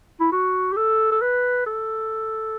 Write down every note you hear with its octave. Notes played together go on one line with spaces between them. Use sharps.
E4
F#4
G4
A4
A4
B4
A4